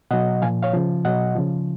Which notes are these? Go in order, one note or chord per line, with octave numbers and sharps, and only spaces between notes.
B2 F#3 D#5 F#5
A#2 F3 F5 G#5
C#5 F5
C#3 F3
B2 F#3 D#5 F#5
C#3 F3